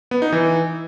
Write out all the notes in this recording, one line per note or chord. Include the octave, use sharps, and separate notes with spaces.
B3
D#4
E3